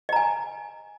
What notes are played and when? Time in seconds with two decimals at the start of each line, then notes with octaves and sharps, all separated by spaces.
0.09 D#5
0.13 A#5
0.16 G#5